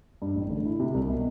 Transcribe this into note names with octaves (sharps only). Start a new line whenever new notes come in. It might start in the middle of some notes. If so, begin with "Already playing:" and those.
G2
A1
D3
E4
C3
C2
B2